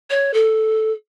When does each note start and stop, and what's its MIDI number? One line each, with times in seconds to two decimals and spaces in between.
0.10 0.33 73
0.34 0.92 69